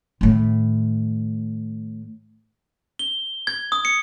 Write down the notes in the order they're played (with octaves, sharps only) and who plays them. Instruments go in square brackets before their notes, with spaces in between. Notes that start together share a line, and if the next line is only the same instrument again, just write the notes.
[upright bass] A2 D#3
[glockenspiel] G7
G#6
D#6
C#7